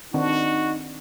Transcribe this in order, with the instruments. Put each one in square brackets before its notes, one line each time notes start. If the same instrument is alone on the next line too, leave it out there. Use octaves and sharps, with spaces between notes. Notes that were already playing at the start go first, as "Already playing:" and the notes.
[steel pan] D#3 C4 D4 [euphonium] D#4 [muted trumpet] F#4